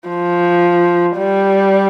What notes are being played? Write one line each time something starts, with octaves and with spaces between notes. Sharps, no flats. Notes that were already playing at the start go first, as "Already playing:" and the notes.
F3
G3